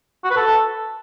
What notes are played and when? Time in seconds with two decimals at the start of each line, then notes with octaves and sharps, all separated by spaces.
0.24 F#4
0.31 B4
0.37 A4